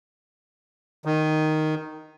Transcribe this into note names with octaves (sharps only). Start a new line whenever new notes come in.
D#3